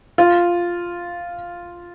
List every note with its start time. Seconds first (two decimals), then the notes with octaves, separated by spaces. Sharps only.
0.18 F4